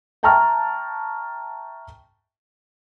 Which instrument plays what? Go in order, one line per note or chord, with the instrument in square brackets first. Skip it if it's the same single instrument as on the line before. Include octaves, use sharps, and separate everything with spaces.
[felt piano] E5 G5 A5 A#5 C#6 F6